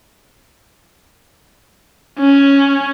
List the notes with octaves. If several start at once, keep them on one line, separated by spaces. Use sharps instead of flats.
C#4